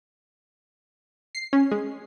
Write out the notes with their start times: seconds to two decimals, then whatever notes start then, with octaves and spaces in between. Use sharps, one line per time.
1.35 C7
1.53 C#4
1.71 G#3